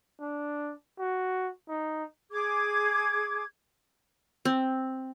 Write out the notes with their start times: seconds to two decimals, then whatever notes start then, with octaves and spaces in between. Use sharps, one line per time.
0.20 D4
0.99 F#4
1.68 D#4
2.32 G#4 D6 G#6
4.45 C4